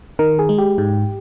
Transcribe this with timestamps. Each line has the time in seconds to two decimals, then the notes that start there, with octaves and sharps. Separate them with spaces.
0.19 D#3 A#4
0.39 G#4
0.49 G#3
0.58 G4
0.78 G#2